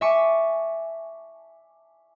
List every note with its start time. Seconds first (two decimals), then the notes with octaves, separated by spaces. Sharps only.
0.01 E5 G#5 A5 C#6 D6